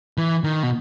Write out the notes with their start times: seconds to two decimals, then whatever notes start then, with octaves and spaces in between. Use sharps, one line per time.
0.18 E3
0.44 D#3
0.63 B2